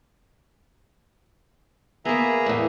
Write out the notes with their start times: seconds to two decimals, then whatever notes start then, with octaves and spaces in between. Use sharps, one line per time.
2.05 A#3 B3 G#4 E5 A#5
2.46 E2 A2